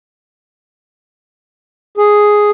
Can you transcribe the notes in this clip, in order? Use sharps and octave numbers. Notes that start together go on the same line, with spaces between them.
G#4